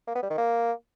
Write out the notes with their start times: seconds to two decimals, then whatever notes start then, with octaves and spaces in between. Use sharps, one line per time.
0.08 A#3
0.15 B3
0.23 G3
0.30 D#3
0.38 A#3